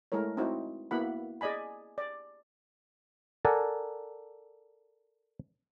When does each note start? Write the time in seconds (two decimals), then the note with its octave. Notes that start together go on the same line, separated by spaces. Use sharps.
0.12 G#3 A3 E4 A#4 C#5
0.37 C4 D#4 E4 F#4 C5
0.91 A#3 B3 E4 F#4 F#5 B5
1.41 G#4 D5 D#5 G#5 B5
1.98 D5
3.45 A4 A#4 D5 F#5 G#5